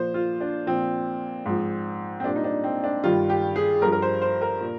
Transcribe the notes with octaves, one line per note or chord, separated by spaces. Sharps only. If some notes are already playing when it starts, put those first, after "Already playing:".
Already playing: A#2 F3 C5
F4
D4
A#2 F3 C4
G#2 F3
C4
A#2 G3 D4
D#4
D4
C4
D4
G2 D#3 G3 F4
G4
G#4
G2 F3 A#4
A#4
C5
C5
A#4
A#2